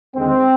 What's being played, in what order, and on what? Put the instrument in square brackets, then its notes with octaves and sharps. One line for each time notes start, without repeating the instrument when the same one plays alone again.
[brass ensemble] D#2 D3 G#3 C4